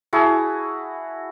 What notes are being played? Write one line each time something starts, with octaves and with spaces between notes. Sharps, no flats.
E4 F#4 G#4 A5